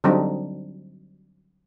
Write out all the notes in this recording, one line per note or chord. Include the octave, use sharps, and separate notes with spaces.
D3 F#3 G3 C4 D4 D#4